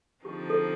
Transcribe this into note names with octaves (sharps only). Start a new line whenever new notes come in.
D3 F3 C4 D#4 G4
A4